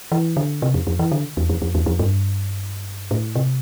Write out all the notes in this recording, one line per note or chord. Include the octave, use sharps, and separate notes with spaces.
E3
D3
C3
F2
F2
E3
D3
E2
F2
F2
E2
F2
G2
A2
C3